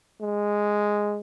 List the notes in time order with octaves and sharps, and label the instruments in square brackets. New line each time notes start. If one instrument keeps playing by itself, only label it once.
[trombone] G#3